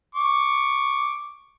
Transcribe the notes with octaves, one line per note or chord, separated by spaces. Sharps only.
C#6 D6